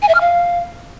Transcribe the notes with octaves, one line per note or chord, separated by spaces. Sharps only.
G#5
E5
F6
F5